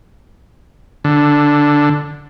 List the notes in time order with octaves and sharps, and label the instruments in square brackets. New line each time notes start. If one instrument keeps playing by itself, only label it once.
[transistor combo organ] D3